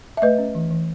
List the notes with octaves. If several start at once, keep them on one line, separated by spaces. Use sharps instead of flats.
E5
A3 B4 D#5
C#4
E3
E3